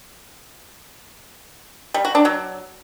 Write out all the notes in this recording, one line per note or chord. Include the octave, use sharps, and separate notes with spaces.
G3
F#4
D4
F#3